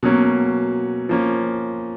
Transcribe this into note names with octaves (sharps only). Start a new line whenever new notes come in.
B2 F#3 A#3 C#4
F3 A#3 C#4